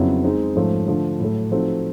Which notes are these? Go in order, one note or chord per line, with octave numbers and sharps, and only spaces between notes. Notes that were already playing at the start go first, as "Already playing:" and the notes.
Already playing: F2 C#3 F#3 B3 E4
G#3 C4 D#4
G#2 F3 A3 C#4
D3 F3 A3
A2 F#3 A3
F3 A3 C4 D#4 F#4